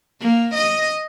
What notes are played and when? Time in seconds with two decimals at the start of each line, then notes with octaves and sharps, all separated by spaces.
0.20 A#3
0.55 D#5